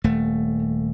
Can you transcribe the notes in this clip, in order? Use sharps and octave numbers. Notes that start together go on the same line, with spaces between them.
D#1 A3